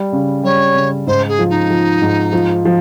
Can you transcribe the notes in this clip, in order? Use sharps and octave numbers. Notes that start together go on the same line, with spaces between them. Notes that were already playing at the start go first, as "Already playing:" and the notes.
Already playing: G3
C#3
G3 C#5
C#3
G#2 C5
G#4
F3
D#4
F3
G#2
F3
F3